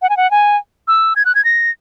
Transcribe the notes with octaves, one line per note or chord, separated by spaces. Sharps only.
F#5
G#5
F#5
G#5
E6
G#6
F#6
G#6
A#6